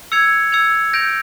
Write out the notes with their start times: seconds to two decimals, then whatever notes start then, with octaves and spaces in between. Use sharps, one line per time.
0.12 E6 G#6 C#7 F7
0.52 E6 G#6 C#7 F7
0.93 G6 A#6 D7 F7